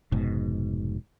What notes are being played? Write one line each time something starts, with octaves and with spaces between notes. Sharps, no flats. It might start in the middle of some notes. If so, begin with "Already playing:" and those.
F1 G#2 B2